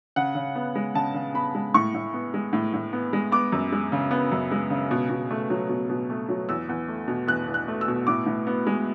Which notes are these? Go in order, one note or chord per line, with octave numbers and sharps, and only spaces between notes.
C#3 F#5
C#3
B3
G#3
C#3 A5
C#3
B3 B5
G#3
A2 C#6
A2
B3
G#3
A2
A2
B3
G#3
B3 D6
F#2
G#3
C#3
B3
F#2
G#3
C#3
B2
B2
A3
F#3
B2
B2
A3
F#3
E2 E6
E2
A3
B2
E2 F#6
E2
F#6
A3
E6
B2
A2 D6
A2
B3
G#3